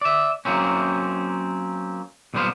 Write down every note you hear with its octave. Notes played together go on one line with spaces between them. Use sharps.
D5 E5
F#3 A#3 C4 C#4
B1 A#2 G3 B3 C5 F5